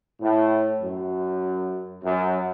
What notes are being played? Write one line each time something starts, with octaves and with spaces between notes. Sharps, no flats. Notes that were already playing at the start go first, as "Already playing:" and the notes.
A2
F#2
F#2